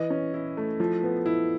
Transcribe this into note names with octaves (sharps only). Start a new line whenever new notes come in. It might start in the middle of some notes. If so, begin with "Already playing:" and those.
Already playing: E3 D#5
C#4
E4
A3
F3
B3
E4